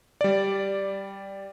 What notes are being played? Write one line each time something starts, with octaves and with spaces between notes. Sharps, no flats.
G3 D5